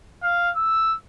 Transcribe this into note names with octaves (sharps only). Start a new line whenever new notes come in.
F5
E6